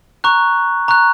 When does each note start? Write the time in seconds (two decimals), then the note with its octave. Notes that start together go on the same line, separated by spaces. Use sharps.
0.24 A#5 C#6 F#6
0.88 A#5 C#6 F#6